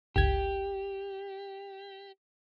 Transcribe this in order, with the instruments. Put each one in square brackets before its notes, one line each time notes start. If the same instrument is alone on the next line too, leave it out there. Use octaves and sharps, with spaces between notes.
[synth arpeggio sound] G1 C#2 G#6 [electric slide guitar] G4